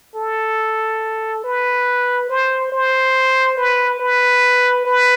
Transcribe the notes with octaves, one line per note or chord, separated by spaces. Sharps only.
A4
B4
C5
C5
B4
B4
B4